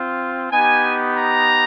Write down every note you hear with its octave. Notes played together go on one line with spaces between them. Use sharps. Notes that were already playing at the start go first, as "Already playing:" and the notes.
Already playing: C4 F4
B3 D#4 G4 G#5
A#5